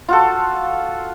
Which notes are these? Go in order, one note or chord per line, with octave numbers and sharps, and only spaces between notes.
F4 F#4 A4